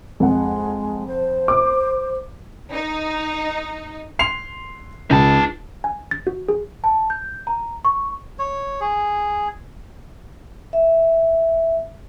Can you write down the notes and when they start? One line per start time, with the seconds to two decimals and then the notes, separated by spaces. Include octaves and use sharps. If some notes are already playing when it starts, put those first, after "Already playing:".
0.20 F2 G#3 F#5
1.08 C5
1.48 D6
2.73 D#4
4.19 C6 C7 F7
5.11 C#2 D#4 A5
5.84 G#5
6.11 A6
6.27 F#4
6.49 G#4
6.84 A5
7.10 G6
7.47 A#5
7.85 C#6
8.39 C#5
8.81 G#4
10.73 E5